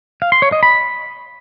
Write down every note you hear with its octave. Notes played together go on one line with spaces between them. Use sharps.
F5
C6
C#5
D#5
B5